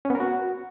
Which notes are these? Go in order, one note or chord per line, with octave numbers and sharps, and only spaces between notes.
C#4
B3
A#4
F#4